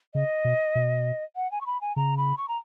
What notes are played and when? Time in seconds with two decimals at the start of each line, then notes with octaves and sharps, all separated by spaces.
0.14 C#3 D#5
0.45 B2
0.75 B2
1.36 F#5
1.52 G#5
1.61 C#6
1.66 B5
1.81 G#5
1.96 C#3 A#5
2.17 B5
2.37 C#6
2.48 A#5